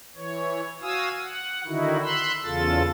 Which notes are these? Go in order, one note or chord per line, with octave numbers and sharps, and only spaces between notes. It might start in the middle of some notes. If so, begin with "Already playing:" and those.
E3 C#5
F#4 F5 G#5 D#6 E6
F#5
D3 D#3 D#4 E4 F#4
B5 C6 E6 F#6
E2 C#3 F4 A4 A6